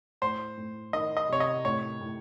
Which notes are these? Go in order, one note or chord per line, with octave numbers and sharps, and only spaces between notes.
A2 C5
A2
D#3 D#5
D#5
C3 C#5
D#5
A2 C#5
A2